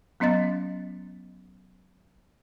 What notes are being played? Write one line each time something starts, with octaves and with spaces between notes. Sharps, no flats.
F#3 B3 C#4 D#5 A6